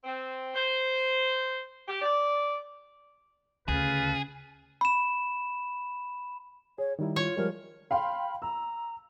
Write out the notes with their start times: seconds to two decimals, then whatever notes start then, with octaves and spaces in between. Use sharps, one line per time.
0.03 C4
0.55 C5
1.88 G4
2.02 D5
3.68 D2 C#3 F4 G#4 B4 F5
4.81 B5 E7
6.78 G#4 C#5
6.99 D#3 G3 D#4 E4
7.16 F4 C#5
7.37 F3 G3 G#3 A#4
7.91 F5 G5 B5 C6
8.42 A#5 E6